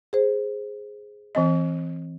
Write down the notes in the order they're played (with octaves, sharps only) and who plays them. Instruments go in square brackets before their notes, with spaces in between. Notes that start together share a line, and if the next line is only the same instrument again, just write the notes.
[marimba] G#4 C5
[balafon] E3 C4 D#5